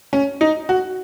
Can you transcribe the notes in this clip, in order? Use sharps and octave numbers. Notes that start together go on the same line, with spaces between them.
C#4
D#4
F#4